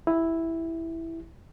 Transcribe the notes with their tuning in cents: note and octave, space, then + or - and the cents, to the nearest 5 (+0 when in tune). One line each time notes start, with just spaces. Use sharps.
E4 +0 G4 +5